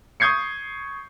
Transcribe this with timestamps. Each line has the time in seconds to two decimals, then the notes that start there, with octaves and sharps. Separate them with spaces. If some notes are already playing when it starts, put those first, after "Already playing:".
0.20 C#6 D#6 G6 G#6 C7 C#7